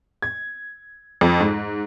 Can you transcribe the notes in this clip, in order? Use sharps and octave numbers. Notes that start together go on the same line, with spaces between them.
G#6
F2
G#2